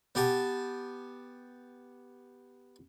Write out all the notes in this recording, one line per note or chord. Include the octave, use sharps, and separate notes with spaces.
B3 G4 G#5 A5